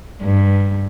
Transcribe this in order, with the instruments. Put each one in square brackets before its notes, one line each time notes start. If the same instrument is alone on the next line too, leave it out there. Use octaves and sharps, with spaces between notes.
[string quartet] G2